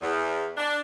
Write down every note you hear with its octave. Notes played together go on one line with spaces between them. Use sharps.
E2
D4